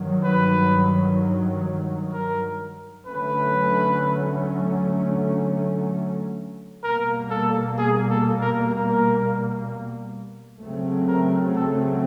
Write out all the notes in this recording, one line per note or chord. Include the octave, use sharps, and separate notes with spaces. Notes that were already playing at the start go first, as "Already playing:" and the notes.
Already playing: G2 D#3 F#3
B4
A#4
D3 F#3 A3 C#4 B4
B2 G3 A#3 A#4
A4
G#4
A4
A#4
A#4
C#3 F#3 A3 C4
A#4
A4